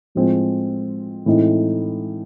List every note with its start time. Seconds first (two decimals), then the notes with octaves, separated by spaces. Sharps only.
0.15 A2 F3 G#3 C4 F4
1.26 A2 E3 G#3 C4 D#4